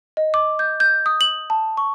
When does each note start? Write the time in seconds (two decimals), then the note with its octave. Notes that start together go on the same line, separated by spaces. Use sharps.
0.17 D#5
0.34 D6
0.59 G6
0.80 G6
1.06 D#6
1.21 F#7
1.50 A5
1.77 C#6